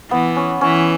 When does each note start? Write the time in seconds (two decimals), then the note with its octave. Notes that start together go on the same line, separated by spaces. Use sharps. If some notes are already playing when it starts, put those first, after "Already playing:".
0.11 E3 B3
0.36 C#4
0.61 E3 C#4